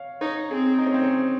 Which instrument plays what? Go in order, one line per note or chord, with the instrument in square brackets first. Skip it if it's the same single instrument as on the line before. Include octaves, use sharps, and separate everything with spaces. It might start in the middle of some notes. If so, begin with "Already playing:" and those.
Already playing: [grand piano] C#5 F5
[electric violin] D#4 [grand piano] C#5
[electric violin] C4 [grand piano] G#4
[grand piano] D#4
C#4
C4
C#4